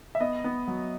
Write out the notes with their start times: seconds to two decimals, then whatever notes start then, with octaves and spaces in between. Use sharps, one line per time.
0.15 E5
0.20 B3 D#5
0.44 B3
0.67 F#3